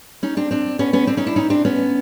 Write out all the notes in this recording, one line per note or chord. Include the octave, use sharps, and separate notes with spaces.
C#4 D#4
C4 D4
C4 D4
B3 C#4
B3 C#4
C4 D4
C#4 D#4
D4 E4
C#4 D#4
C4 D4
B3 C#4